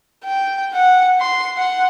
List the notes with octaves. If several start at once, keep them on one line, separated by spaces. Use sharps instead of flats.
G5
F#5
C6
F#5